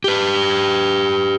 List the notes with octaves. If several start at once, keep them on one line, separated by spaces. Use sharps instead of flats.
G4 B4